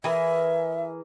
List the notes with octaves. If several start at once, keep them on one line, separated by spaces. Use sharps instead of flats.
E3 G#4 A#4 E5